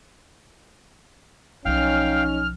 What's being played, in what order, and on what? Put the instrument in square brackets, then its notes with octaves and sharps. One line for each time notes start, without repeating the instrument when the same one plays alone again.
[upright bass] B1 F3 [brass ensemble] C#4 D#4 [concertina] F5 G5 [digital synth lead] F6